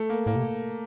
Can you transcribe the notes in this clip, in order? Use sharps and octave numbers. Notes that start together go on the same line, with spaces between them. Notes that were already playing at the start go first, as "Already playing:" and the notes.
Already playing: A3
A#3
A2 A#3
C3